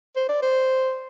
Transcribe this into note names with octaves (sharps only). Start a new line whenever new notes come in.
C5
D5
C5